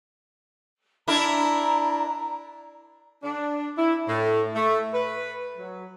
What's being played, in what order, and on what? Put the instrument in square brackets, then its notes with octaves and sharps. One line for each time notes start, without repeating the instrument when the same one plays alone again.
[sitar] D4 E4 A#4 [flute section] A#5
[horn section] D4
E4
A2
A3
B4
F#3